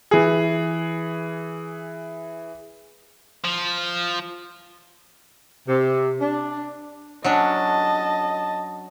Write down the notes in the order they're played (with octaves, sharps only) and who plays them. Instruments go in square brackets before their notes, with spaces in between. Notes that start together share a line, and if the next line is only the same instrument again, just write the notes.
[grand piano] E3 G#4
[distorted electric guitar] F3
[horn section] C3
D4
[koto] F#3 C#4 D4 [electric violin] D#5 A5